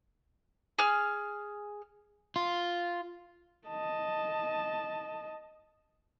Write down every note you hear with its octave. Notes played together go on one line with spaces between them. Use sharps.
G#4 F6
F4
D#5 A5